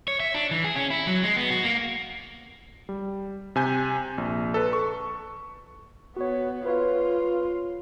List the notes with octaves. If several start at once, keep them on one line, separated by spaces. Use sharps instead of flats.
C#5
E5
D4
E3
G#4
C#4
E4
F#3
G#3
B3
F#4
A#3
G3
C3 G#5 G6
A#1
A4 B4
C#6
B3 F#4 C#5
F4 B4 C#5 F5